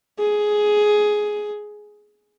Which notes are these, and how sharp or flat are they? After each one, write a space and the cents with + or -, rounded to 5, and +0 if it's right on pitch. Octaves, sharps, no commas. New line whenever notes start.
G#4 +10